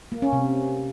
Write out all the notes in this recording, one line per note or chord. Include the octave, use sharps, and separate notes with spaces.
A#3
C#4
C3